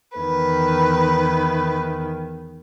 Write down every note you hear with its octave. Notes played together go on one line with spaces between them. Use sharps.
E2 D#3 B4